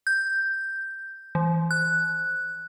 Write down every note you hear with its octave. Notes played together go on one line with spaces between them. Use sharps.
G6
E3
F#6